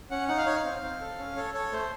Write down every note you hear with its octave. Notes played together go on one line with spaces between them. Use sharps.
C#4 F#5
D#4 F#5
F5
D#4 C#5
F5
C4
C4
A4
C#4
A4 C#5
A4 C#5
A3 C5